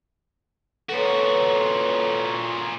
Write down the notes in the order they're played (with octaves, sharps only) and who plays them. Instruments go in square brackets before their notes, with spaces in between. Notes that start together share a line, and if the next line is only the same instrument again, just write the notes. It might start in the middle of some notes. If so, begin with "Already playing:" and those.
[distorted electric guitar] A#2 F#4 [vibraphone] A4 B4 C#5